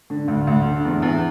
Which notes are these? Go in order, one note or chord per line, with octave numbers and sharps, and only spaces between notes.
D3
D2
D2
D3
E2
E2